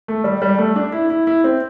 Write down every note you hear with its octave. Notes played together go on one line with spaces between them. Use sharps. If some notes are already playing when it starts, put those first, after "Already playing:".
A3
G3
G3
A3
D4
E4
E4
E4
C4